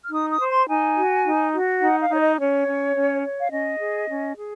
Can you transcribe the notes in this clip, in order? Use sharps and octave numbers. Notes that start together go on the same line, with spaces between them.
F6
D#4 D#6
D#6
C5
C6
D#4 G#5
F#4
D#4
F#4
D#4 F#5
F5
D#4 C#5
D#5
C#4 C#5
C#4
C#4
C#5
F5
C#4 D#5
G#4
C#4
G#4